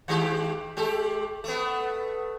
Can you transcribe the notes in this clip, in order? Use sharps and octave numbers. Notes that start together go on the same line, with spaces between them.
D#3 G#3 G4
G#3 G4 A4
A3 B3